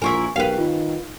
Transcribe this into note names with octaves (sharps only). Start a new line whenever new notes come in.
A#1 E4 F4 A#4 G#5 C#6
B1 G4 A#4 B4 F5 G5
D#3 F4